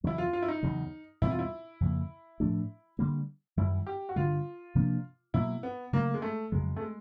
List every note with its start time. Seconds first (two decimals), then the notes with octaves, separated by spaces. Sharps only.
0.04 E2 C#3 F#3 E4
0.18 F4
0.33 F4
0.42 E4
0.48 D#4
0.63 E2 C#3 F#3
1.21 E2 B2 G3 C4 E4
1.30 F4
1.39 E4
1.80 F2 C#3 F3 A#3
2.40 A2 F3 A3 D4
2.99 D3 G3 A#3
3.57 F#2 D#3 G3 E4
3.87 G4
4.09 F#4
4.16 G2 D3 G3 F4
4.75 C3 F3 A#3 D4
5.34 B2 F#3 A#3 E4
5.63 B3
5.93 C#3 F#3 A3 A#3
6.14 G#3
6.22 A3
6.52 F2 C#3 F#3 G#3
6.76 A3
6.81 G#3